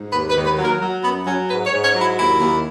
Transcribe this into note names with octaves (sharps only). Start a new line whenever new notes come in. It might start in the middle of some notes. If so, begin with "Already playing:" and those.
Already playing: G#2
D#2 B4
B4
D#2
B4
F#3
A#4
F#3
F#2 B3
F#3 C#4
G#2 B4
C#5
G#2
C#5
F#3
E4
D#2 E4
D#2